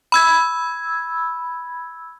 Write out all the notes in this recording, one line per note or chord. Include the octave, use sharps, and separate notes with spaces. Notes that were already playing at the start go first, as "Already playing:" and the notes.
B5 E6 G#6